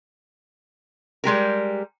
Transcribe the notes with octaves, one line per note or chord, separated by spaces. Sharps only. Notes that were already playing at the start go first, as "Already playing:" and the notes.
G3 G#3 G4 A#4